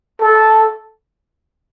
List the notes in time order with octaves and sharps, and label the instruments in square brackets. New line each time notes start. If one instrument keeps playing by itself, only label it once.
[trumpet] A4